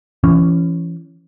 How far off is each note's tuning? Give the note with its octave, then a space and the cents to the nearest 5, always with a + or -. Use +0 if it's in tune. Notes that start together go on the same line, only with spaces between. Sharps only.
E3 +35 C#4 +0